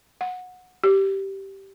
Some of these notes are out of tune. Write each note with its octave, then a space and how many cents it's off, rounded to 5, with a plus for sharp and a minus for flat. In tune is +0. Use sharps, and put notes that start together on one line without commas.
F#5 -20
G4 -10